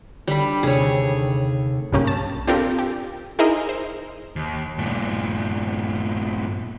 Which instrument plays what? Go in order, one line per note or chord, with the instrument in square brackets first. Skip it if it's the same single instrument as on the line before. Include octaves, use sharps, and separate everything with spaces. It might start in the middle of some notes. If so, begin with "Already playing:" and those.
[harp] D3 G4 B6 [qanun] G3 B5
[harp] D#2 C3 A3 [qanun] G#4 C#5
[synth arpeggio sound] B1 G2 C#3 A#3 C#4 G4
A5
C4 D4 F4 G4 A4 A#4
G4
D#4 E4 G#4 A#4 C5 D#5
C5
[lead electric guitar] D#2
G2 A#2